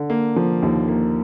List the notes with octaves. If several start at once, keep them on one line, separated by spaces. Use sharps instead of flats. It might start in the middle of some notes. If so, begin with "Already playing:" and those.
Already playing: D3
A#3
F3
D#2
A#3